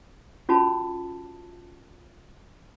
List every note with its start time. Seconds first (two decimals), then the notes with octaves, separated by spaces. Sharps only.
0.49 C#4 F4 F#4 A5 B5